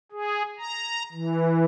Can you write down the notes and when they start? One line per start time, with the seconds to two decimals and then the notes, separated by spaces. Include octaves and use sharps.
0.12 G#4
0.58 A#5
1.12 E3